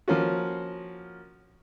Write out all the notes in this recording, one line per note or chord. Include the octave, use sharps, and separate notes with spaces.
F3 A#3 C#4 F4 F#4